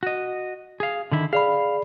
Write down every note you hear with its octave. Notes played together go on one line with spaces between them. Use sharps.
F#4 D#5
G#4 F5
D3 D#3 E4
G#4 D5 F5 B5